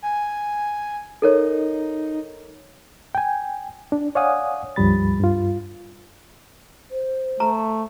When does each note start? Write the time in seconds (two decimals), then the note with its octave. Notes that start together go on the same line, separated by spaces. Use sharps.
0.02 G#5
1.22 D#4 A4 A#4 C#5
3.15 G5 G#5
3.92 D4
4.15 C#5 D5 F5 F#5 G#5 D#6
4.76 C#2 G2 F3 G3 B5 A6
5.20 G2 F4
6.91 C5
7.40 A3 A#5